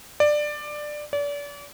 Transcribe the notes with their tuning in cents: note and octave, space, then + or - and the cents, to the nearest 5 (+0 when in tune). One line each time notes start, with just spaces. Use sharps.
D5 +15
D5 -35